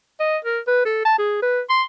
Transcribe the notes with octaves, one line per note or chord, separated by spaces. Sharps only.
D#5
A#4
B4
A4
A5
G#4
B4
C6